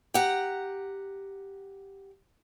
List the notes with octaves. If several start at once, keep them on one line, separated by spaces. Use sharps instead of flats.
G4 F#5 A#5